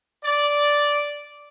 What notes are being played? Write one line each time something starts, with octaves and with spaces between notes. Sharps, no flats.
D5